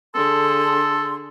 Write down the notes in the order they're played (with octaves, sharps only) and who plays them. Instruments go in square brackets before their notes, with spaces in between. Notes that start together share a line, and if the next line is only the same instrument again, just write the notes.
[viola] D3 G#4 [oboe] A4 [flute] C6